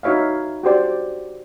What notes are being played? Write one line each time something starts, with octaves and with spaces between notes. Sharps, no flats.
D#4 E4 F#4 C#5 E5 F5
F#4 G4 C5 D5